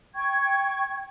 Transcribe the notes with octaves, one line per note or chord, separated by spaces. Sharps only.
G5 C#6 G#6